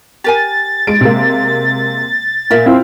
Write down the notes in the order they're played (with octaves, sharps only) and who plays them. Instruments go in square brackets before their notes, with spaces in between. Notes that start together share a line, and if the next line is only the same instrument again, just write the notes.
[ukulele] G4 A#4 G#5 [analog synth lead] A6
[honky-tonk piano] G#3 D7
C3 G#3 A#3
[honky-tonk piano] A#2 [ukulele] A#4 E5
[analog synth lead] C4 [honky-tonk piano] E4 F4